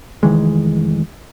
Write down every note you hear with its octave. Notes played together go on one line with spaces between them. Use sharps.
F1 D#3 E3 G#3